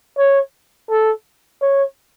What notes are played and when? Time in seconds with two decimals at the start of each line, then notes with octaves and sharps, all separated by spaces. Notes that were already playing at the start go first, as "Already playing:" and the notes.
0.18 C#5
0.90 A4
1.62 C#5